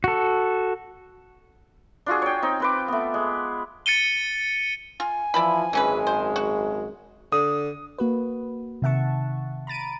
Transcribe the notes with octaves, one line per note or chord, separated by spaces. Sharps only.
F#4 A4
D4 F4 F#4 G#4
C#5 G5
C4 D#4
C4 B4 D6
A3 B3
G#3
A6 C#7 D#7 G7
F4 G#5
E3 F3 D5 E5 B5
G#1 F#2 E3 G#3 C#4 B4
C5
F#4
D3 D#6
A#3 F#4 B4
C3 D#3 E5 F#5 A5 C#6
A#5 B5 A6 D7 D#7